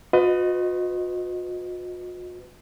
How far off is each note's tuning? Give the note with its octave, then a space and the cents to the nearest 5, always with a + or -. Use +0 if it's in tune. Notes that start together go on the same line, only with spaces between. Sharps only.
F#4 -45 B4 +30 D#5 +0